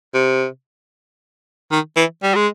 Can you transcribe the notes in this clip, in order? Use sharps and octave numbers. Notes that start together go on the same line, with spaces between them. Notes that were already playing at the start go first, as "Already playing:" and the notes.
C3
D#3
E3
G3
G#3